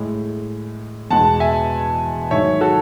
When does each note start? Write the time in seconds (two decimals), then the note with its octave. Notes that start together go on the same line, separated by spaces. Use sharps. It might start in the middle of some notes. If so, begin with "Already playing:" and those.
Already playing: A2 G#3
1.10 E2 B2 G#3 F#5 A5
1.40 E5 G#5
2.31 G#2 D#3 F#3 C#5 E5
2.61 F#4 A4